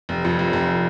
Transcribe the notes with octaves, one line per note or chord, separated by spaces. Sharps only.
F1
F2
F1
F1